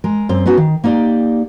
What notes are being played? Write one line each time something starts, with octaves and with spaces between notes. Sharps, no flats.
G#3 A#4
F#2 C4 C5
B3 C#4 D#4 F#4
D#3
A#3 D#4 G4 D5